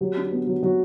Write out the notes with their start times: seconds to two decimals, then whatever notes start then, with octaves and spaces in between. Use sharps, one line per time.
0.01 F#3 G4
0.17 D4
0.31 B3
0.47 F#3
0.62 F#3 F#4